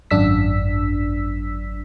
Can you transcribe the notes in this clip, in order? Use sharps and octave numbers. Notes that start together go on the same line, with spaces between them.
G#1 F#2 D4 E6 B6